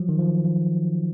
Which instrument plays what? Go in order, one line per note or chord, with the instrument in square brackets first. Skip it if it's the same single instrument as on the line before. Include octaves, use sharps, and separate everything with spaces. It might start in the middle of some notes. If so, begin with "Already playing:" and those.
Already playing: [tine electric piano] F3 F#3
D#3
F3
F3